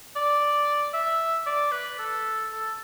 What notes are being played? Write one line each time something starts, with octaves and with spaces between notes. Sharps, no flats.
D5
E5
D5
B4
A4
A4